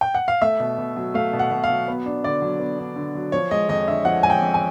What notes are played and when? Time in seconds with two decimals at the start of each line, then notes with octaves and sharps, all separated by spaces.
0.01 G5
0.15 F#5
0.28 F5
0.42 A3 E5
0.60 B2
0.78 B2
0.96 F#3
1.14 A3 F5
1.33 B2
1.39 F#5
1.51 B2
1.64 F5
1.70 F#3
1.88 B3
2.06 D4
2.24 D3 D5
2.42 F#3
2.60 B3
2.79 D4
2.96 D3
3.15 F#3
3.32 F3 C#5
3.51 G#3 D#5
3.69 F2 D#5
3.87 D3 E5
4.05 F3 F#5
4.23 G#3 G#5
4.30 G5
4.42 F2
4.54 G#5